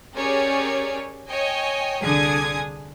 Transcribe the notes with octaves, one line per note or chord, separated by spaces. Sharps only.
C#4 G4 G#4 A#4 C#5 D5
C#5 D#5 G5 G#5
C2 D3 G#4 G#5 D#6 G#6